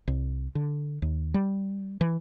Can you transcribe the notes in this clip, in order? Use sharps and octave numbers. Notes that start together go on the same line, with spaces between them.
C2
D3
D#2
G3
E3